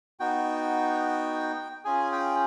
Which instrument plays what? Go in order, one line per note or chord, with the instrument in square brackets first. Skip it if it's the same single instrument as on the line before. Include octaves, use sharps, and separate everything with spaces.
[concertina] B3 D#4 F#4 G5
C#4 F4 G#4 G#5
G5